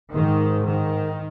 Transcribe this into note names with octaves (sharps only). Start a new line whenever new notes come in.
G#2 D#3
D#3